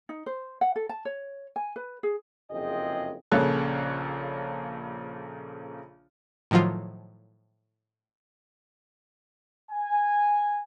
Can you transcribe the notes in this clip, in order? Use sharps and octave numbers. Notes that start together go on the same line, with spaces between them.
D#4
C5
F#5
A4
A5
C#5
G#5
B4
G#4
F#1 F2 C3 G#4 D#5 G5
A#1 C#3 A#3 A4 C#5 F#6
A2 D#3 F3 F#3 F4
G#5